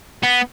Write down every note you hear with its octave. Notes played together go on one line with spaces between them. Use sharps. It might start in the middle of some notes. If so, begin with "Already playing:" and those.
B3